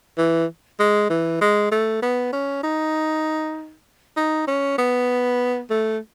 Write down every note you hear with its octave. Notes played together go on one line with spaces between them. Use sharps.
E3
G#3
E3
G#3
A3
B3
C#4
D#4
D#4
C#4
B3
A3